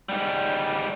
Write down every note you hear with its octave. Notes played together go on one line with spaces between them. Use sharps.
G#2 G3